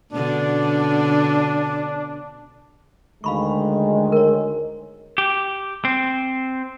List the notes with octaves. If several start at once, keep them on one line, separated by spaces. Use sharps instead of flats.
B2 D3 C#4 D4
D2 D#3 G#3 F5 B5 C#6
A#4 C#5
G4
C4